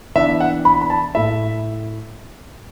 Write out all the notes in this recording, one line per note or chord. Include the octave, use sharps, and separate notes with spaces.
E3 B3 D4 E5
F#5
B5
B5
A5
A2 A3 E4 E5